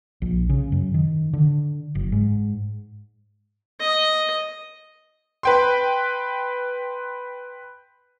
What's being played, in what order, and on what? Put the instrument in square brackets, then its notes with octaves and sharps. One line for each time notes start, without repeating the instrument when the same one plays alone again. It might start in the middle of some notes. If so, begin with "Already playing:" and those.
[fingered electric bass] A#1
C#3
F#2
D#3
D3
F#1
G#2
[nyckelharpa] D#5
[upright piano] B4 G5 C6